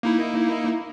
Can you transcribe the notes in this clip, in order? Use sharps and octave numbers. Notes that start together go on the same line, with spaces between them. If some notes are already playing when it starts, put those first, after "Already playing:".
A#3 D#4 E4